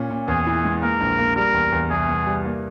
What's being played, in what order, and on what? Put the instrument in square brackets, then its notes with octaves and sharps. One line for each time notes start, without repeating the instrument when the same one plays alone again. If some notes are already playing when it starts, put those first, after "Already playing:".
Already playing: [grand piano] A#2 C#4
A#2
[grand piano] E2 [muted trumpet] G#4
[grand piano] E4
G#3
[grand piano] A#3 [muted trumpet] A#4
[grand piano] A#1
A#3
[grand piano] G3 [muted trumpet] A#4
[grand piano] E2
E2
[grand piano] C2 [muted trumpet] G#4
[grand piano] C2
G3
A#3